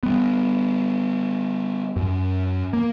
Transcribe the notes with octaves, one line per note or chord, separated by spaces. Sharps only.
G3 B3
F#2
A#3